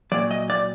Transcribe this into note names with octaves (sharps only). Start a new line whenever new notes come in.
A#2 F#3 D5
D#5
D5